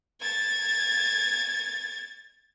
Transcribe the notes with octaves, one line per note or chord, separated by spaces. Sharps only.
G#6 A6